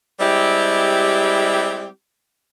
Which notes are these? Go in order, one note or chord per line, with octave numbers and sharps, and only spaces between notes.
G3 G#3 C4 E4 G4